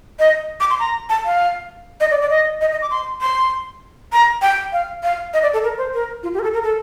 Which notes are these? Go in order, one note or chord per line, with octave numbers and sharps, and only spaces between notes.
D#5
D6
C6
A#5
A5
F5
D#5
D5
D5
D#5
D#5
D#5
D6
C6
C6
A#5
G5
F5
F5
D#5
D5
A4
A#4
C5
A#4
F4
G4
A#4
A4
A#4
A4